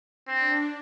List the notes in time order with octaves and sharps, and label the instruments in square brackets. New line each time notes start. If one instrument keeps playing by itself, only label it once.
[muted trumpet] C4 [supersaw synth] D4